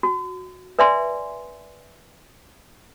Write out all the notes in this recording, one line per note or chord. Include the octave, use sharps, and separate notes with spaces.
F#4
B4 D5 E5 G#5 C6